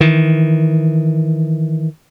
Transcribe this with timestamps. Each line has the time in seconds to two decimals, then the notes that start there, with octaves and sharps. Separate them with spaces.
0.01 D#3 E3